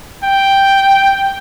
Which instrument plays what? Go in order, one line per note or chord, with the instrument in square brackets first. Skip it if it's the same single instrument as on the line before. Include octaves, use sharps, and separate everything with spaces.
[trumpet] G5